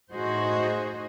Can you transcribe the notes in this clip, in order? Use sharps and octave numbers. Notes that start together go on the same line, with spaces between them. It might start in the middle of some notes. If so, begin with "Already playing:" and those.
A2 D#4 F#4 G#4 C5 D#5